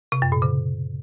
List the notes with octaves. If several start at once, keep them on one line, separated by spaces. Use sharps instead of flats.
C3
F#2
A#2
C#3